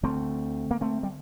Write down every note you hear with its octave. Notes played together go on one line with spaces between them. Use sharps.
D2 D3 A3 C4
A#3
A3 C4
G3